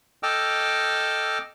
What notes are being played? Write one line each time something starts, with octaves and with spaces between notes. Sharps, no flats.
A4 D#5 G5 D6 E6 F6